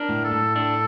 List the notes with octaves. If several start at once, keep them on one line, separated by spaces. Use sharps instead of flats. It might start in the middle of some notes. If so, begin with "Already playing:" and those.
Already playing: D4 A#4
A2
A4
A2
D4 A4